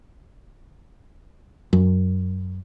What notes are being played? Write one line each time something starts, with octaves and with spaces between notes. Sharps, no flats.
F#2